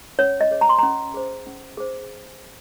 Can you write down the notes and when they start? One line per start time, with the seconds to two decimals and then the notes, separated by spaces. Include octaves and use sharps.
0.19 C#4 C#5
0.41 D#5
0.51 G#4 C#5
0.61 A#5
0.69 C6
0.78 C#4 A#5
1.14 G#4 C5
1.47 C#4
1.77 G#4 C5